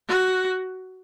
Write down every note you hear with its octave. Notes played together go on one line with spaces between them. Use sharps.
F#4